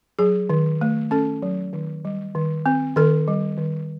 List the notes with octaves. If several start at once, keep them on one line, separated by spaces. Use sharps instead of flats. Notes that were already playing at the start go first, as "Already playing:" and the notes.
F#3 G#4
D#3
A3
C#4 A4
F#3
D#3
G3
D#3
C4
D#3 A4
G3
D#3